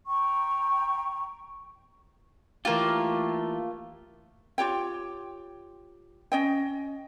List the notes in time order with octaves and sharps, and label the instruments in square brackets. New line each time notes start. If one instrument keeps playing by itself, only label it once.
[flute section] G5 A#5 C#6
[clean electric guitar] E3 G4 [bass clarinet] A3 [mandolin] A#3 F4
[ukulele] F4 G4 C#5 G5
C#4 D#5 G5